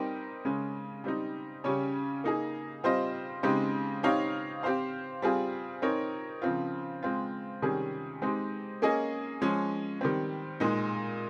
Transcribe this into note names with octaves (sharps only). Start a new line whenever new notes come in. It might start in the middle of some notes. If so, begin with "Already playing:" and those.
Already playing: G3 C4 D#4 G4 A#4
C#3 G#3 C#4
G3 C4 D#4
C#3 G3 C#4 G4 C#5
A#3 D#4 G#4
G3 C4 F4 C5 D#5
C#3 G#3 C4 D#4 G4
C4 D#4 G4 C#5 F5
C4 G4 C5 F5
G3 C4 F4 G#4
C4 D#4 A#4 C#5
C#3 F3 C4 F4
G#3 C4 F4
C3 D#3 G3 C#4 G#4
G#3 C4 D#4 G4
A#3 C#4 G#4 D#5
F3 G#3 C#4
D#3 G3 C4
A#2 G#3 D#4